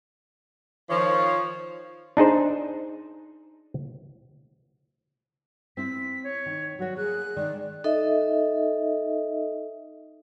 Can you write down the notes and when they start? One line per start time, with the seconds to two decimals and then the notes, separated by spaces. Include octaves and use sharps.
0.90 D#3 F3 C#5
2.17 D4 D#4 G#4 C5
5.77 C4 E4 C5 B6
6.24 C#5
6.46 D#3
6.79 F#3 F#4 C#5
6.97 A#3 G#4 F#6
7.36 D#3 G#3 D5
7.84 D#4 A4 D#5 E5